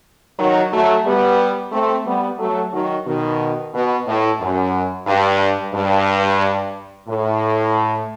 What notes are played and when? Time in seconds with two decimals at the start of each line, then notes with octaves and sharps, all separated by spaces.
0.39 D#3 F#3
0.72 F#3 A3
1.06 G3 B3
1.72 A3 C4
2.06 G3 B3
2.39 F#3 A3
2.73 D#3 F#3
3.07 B2 D#3
3.74 B2
4.07 A2
4.40 F#2
5.07 G2
5.74 G2
7.08 A2